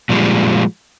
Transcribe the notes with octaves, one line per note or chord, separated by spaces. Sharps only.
A#2 F3 G3 G#3